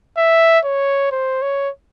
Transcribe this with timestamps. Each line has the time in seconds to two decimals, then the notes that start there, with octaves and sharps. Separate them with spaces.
0.17 E5
0.64 C#5
1.11 C5
1.42 C#5